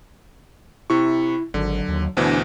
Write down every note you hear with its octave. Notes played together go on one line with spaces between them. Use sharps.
C3 E4 C#6
G#1 D3 F#3
D#2
D2 B2 E3 D4 C5